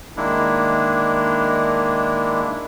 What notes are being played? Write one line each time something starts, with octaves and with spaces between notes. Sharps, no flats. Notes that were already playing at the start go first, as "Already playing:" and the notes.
D#3 G#3 A#3 D4 E4